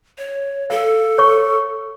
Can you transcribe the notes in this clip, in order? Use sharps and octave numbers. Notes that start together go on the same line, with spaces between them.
C#5
A4 F5
C#5 C#6